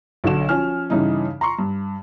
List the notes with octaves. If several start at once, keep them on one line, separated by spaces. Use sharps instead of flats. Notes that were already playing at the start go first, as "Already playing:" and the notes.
B1 D3 E7
F3 C#4 G#5 F6
G2 C#3 E3 D#4
A#5 C6 C#6
G2